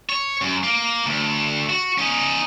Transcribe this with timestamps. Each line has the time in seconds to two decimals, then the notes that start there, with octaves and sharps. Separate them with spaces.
0.09 C#5
0.42 F#2
0.63 A#3
1.06 D2
1.69 F#4
1.98 C#4 D#4